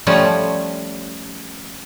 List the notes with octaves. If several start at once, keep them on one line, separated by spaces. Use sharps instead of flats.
F3 G3 A3 C#4